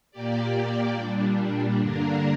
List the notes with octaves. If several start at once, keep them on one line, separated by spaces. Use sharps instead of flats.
A#2 A#3 G4 D5
A#2 G3 D4
G2 D3 A#3 D4 A#4